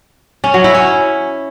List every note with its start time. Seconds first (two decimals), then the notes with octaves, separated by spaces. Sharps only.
0.44 C#4
0.54 F#3
0.64 E4
0.75 C#4